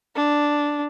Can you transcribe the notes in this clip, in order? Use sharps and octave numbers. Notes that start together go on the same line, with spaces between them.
D4